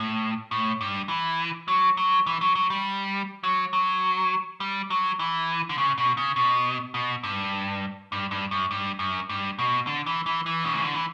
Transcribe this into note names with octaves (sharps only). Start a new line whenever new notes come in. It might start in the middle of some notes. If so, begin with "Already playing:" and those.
Already playing: A2
A2
G2
E3
F#3
F#3
E3
F#3
F#3
G3
F#3
F#3
G3
F#3
E3
D3
C#3
B2
C#3
B2
B2
G2
G2
G2
F#2
G2
F#2
G2
B2
D3
E3
E3
E3
B2
C#3
D3
E3